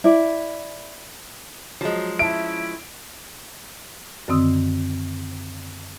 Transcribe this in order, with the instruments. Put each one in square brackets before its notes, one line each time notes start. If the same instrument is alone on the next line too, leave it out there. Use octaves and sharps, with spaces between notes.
[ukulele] E4 D5
[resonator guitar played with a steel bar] F3 G#3 [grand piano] F#3
[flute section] C#4 E4 [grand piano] E5 A5 [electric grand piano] D7
[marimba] F#2 D3 D#3 C4 D#6 E6